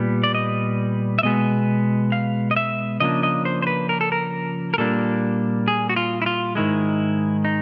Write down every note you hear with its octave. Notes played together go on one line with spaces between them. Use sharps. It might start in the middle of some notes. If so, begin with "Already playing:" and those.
Already playing: A#2 G3 B3
D5
D#5
E5
B2 G#3 B3 D#5
F5
D#5
E5
C#3 F3 A#3 D4 D#5
D#5
C5
C5
B4
A#4
A4
A#4
A#4
A#2 G3 A#3 D4 A4
G#4
F#4
F4
E4
F4
G#2 D#3 G#3 E4
D#4